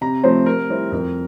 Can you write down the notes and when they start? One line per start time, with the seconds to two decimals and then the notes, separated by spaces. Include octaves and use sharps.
0.01 C3 A#5
0.24 F3 A3 C4 C5
0.46 C3 A#4
0.69 G3 C4 E4
0.92 F2 A#4